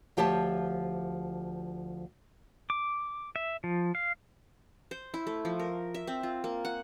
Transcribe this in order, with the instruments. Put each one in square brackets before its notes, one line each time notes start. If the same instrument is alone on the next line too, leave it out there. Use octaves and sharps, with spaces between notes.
[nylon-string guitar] D2 F3 G4 C#5 E5 A5
[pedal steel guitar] D6
E5
F3
F5
[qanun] C5
E4
A3
F3
A#4
E5
C4
F4
A#3
F#5